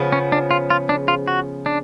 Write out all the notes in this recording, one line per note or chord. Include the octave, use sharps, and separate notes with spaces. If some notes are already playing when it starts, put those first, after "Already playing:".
Already playing: C#3 F3 B3
C#4
D4
F4
F4
D4
F4
F#4
D4